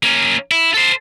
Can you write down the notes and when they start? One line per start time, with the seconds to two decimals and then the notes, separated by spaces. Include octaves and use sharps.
0.03 A#3 C#4
0.51 E4
0.74 A4 C5